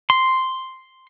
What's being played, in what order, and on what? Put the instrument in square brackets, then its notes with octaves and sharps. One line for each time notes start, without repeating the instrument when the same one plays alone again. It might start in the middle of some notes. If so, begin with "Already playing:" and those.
[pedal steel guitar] C6